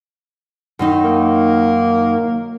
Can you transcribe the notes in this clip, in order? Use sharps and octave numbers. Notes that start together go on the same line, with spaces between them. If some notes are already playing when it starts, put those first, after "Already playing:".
F#2 D#3 D#4
A#3